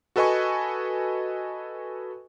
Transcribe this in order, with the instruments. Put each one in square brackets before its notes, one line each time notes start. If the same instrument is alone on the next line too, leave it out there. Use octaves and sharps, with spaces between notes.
[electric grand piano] F#4 A4 B4 D#5 G#5 C#6